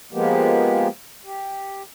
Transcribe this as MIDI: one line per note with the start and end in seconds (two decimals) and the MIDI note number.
0.13 0.88 53
0.13 0.88 56
0.13 0.88 58
0.13 0.88 59
0.13 0.88 67
1.25 1.83 67